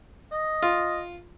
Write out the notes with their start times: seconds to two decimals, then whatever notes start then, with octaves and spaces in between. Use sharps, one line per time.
0.32 D#5
0.63 F4